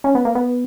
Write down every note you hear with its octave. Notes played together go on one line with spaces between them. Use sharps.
C#4
B3
A#3
B3